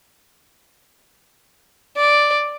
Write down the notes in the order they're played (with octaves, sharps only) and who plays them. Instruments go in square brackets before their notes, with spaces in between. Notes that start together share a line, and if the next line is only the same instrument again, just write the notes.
[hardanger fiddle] D5